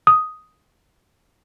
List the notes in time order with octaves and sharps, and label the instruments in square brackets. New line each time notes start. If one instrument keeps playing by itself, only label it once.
[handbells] D#6